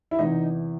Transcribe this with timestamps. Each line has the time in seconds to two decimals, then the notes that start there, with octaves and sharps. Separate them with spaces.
0.11 E4
0.19 E2 C3 E3 D#4